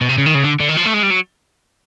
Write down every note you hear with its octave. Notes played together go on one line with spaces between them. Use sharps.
B2
C3
C#3
D#3
C#3
D3
D3
D#3
F3
A3
G#3
G3
F#3